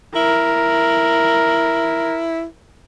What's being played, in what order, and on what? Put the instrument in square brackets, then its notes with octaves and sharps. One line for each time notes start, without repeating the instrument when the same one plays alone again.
[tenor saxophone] E4 [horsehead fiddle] A#4